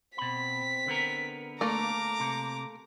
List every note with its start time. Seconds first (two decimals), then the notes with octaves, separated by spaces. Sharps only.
0.18 B2 C4 B5 B6
0.86 D3 B3 A#4
1.61 A3 A#3 A#5 D6
2.20 C3